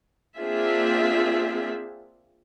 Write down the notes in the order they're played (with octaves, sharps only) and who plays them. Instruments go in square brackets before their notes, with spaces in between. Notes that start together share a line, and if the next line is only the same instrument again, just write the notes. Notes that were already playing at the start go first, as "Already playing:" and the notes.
[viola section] A#3 C4 D4 F4 G#4 E5